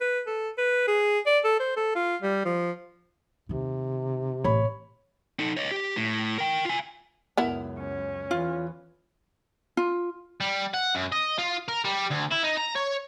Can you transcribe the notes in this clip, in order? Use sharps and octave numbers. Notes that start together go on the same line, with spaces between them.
B4
A4
B4
G#4
D5
A4
C5
A4
F4
G3
F3
D#2 C3 D#3
A1 C#5 B5
D#4 A4
C#5 D#5
G4
A2
A#4 G5
F4 G#5
C#2 F#2 B3 E4 A#4
C#4
E2 E3 F4
F4
G3
F#5
F#2
D#5
F4
A#4
G3
D2
E4
D#4
A#5
C#5